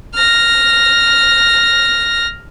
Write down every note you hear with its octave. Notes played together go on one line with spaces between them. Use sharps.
F6 A#6